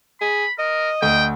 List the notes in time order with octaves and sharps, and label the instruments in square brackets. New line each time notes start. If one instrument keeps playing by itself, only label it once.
[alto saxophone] G#4 [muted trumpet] B5
[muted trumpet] A#4 [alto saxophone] D#5
[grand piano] D2 [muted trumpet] G5